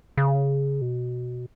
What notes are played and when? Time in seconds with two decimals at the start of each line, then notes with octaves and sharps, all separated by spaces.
0.17 C#3
0.81 B2